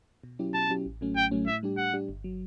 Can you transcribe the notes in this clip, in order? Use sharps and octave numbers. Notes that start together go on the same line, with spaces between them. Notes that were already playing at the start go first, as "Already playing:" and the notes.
B2
F#3 C#4 E4 G4
B2 A5
F#3 C#4 E4 G4
A1
A2 F#3 A3 C#4
A1 G5
A2 F#3 A3 C#4
A2 E5
G3 D4 G4
A2 F#5
G3 D4 G4
G1
F#3